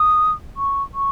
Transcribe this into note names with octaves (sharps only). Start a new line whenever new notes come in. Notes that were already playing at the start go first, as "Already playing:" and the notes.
Already playing: D#6
C#6
C#6